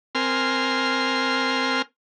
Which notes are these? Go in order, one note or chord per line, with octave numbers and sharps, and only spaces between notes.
C4 A#4 G#5 C6 F6